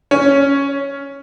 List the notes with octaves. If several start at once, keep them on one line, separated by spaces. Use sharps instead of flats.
C#4